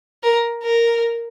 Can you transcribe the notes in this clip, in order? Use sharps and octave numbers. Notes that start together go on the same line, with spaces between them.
A#4
A#4